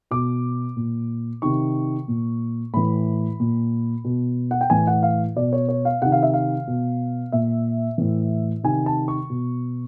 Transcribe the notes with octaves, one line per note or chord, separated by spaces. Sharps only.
B2 D6
A#2
C3 D#3 C#6
A#2
A2 E3 B5
A#2
B2
F#5
G5
A2 E3 G#5
F#5
F5
B2 D5
C#5
C#5
F5
C3 D#3 F#5
F5
E5
F5
B2
A#2 E5
A2 E3
C3 D#3 G#5
A5
C#6
B2